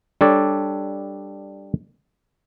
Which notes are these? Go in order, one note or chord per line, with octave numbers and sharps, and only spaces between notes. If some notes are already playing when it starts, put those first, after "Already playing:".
G3 D4 A4 C#5 D5